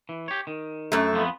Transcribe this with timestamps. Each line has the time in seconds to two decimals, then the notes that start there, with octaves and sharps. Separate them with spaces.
0.09 E3
0.28 G4 C#5
0.47 D#3
0.92 F#2 A3
1.13 F2 F3 B3